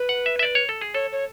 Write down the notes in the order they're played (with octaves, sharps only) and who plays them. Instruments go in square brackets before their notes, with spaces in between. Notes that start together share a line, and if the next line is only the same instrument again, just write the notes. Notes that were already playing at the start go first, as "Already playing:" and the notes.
Already playing: [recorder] B4
[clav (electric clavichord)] F#5
E5
E5
D5
C#5
A4
G#4
[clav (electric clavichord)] A4 [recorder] C#5
[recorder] C#5